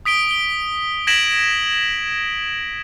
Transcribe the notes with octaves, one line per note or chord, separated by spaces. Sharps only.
D#6 B6 D7 G7
G7
G#6 A#6 B6 D7 E7 F#7